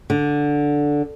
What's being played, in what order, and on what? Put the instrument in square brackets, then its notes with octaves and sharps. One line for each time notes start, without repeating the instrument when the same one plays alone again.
[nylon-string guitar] D3